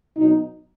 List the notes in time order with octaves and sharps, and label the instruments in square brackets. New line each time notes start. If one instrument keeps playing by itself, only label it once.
[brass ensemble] B2 F#3 D#4